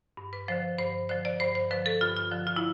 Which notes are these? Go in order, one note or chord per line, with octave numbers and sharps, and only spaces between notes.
G2
B4
D3 F3 C5
G2 C5
D3 F3 C5
D5
G2 C5
C5
D3 F3 B4
A4
G2 F4
F4
D3 F3
F4
E4